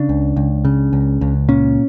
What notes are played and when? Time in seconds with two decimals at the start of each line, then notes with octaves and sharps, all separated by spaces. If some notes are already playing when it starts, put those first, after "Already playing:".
Already playing: C#3 D4
0.09 C#2
0.36 C#2
0.65 C#3
0.93 C#2
1.21 C#2
1.49 A#2 C#4